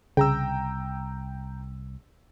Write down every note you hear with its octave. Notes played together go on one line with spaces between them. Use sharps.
C2 C#3 G5 A#5 E6